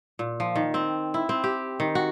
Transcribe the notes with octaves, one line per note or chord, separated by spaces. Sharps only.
A#2
F3
D#3
C4
E4
C4
G4
D#3
F#4